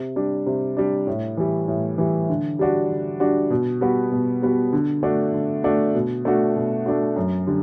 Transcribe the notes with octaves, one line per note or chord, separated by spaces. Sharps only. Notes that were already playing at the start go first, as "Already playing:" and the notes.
Already playing: C3
G3 D4
C3
G3 D4
A2
E3 G3
A2
E3 G3
D3
G3 D4 F#4
D3
G3 D4 F#4
B2
G3 B3 F#4
B2
G3 B3 F#4
D3
A3 D4 F#4
D3
A3 D4 F#4
B2
A3 D4 F#4
B2
A3 D4 F#4
F#2
D3 G3